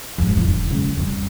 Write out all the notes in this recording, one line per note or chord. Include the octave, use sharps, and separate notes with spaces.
F2 G#2
E1
C#2
F2 G3